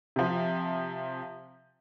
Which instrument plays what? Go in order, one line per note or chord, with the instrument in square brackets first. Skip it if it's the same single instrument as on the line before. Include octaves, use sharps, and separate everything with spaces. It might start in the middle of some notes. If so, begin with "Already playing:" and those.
[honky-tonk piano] C3 F3